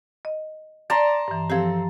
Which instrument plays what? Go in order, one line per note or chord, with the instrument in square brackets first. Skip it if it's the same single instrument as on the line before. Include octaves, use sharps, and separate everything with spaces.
[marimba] D#5
[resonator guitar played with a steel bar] D5 [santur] A5 A#5 C6
[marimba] G2 E3
[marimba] F3 G4 [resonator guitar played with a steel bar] C4 A4